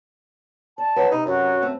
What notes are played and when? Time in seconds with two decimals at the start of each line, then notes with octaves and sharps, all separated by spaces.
0.78 D5 A5
0.96 F#3 B4
1.11 C3 D#4
1.26 F#2 F#4
1.62 A3 C4